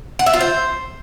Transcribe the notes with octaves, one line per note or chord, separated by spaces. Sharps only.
F#5
E5
F4
C5